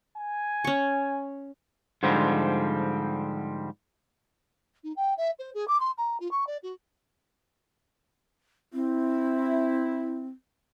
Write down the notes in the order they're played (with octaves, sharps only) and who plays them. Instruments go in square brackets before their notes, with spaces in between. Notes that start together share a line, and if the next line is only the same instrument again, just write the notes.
[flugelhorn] G#5
[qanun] C#4 C#6
[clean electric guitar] G#2 D3 F3 G3 C4
[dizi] D#4
G5
E5
C5
G#4
D6
C6
A#5
F4
C#6
D5
F#4
[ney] C4 [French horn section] E4